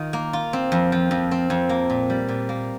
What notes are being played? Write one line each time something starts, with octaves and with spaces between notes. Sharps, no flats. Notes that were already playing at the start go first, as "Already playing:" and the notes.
Already playing: D#3 F4
A#3
F4
C4
F2
F3
F2
C4
F2
A#3
A#2
G3
A#2
A#3